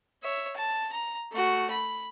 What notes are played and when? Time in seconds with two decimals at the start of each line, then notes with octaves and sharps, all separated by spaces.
0.23 C#5 E5
0.56 A5
0.93 A#5
1.32 A3 F#4
1.70 B5